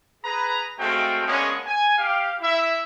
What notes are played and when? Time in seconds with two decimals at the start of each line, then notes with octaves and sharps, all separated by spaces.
0.24 G#4 B4 A#5
0.79 G#3 A3 C4 F#4 F5 G5
1.27 G#3 A#3 B3 C#4 D4 G#4
1.66 G#5
1.98 G4 F5
2.41 E4 E5